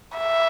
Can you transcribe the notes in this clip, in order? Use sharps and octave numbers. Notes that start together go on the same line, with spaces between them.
E5